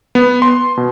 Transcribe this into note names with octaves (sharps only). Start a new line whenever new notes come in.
B3
C6
B2